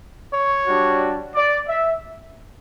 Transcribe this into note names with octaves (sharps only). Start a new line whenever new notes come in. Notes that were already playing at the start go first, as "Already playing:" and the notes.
C#5
G3 D4 F#4
D5
E5